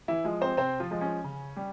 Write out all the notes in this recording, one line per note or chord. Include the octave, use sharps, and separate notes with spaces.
E3 E4
F3 G#3
C4 C5
C3 C4 C5
F3 F4
F3 G#3
C#4
C#3
G3